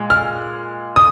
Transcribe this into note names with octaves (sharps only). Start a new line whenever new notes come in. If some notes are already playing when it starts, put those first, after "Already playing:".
Already playing: A#2 G#3
F6
D#6